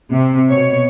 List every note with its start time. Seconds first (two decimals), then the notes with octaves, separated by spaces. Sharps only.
0.12 C3
0.50 B2 C#5